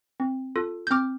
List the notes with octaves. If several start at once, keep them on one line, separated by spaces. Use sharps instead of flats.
C4
F4 A4
G6
C4 D6 F6